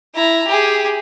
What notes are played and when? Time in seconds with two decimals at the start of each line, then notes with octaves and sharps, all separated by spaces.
0.15 E4 A#5
0.47 G4 G#4